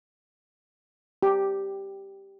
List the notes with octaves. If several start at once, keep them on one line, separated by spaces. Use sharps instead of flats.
G4